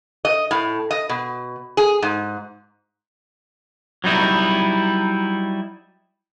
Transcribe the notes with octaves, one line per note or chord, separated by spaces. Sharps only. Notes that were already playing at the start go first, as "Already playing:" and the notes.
D#5
A2
D#5
B2
G#4
G#2
F#3 G3 D#4 E4